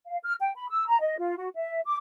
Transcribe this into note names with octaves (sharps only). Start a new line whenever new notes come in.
F5
F6
G5
B5
E6
A#5
D#5
F4
F#4
E5
D6